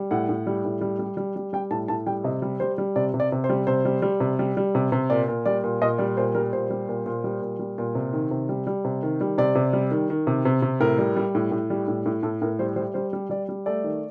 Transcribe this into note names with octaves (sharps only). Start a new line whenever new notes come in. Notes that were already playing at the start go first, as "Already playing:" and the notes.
Already playing: G3
A2 F#5
A2
G3
A2
G3
G3
G3
G3
G3 G5
A2 A5
A2 A5
G3 G5
C3 D#5
G3
G3 C5
G3
C3 D5
C3
D5
C3
C5
G3
C3 C5
G3
G3
C3
G3
G3
C3
C3
A#2 D5
A#2
G3 D5
A#2
A#2 D#5
G3 D5
A#2 C5
G3 A#4
A#2 C5
G3
A#2
A#2
G3
A#2
G3
A#2
C3
D#3
C3
G3
G3
C3
D#3
G3
C3 D5
C3
G3
D#3
D#3
C3
C3
C3
A2 A#4
G3
G3
A2
A2
G3
A2
A2
A2 A4
A2 A#4
G3 C5
G3 C5
G3 C5
G3
G3 D5
G3
A3 D5
D#3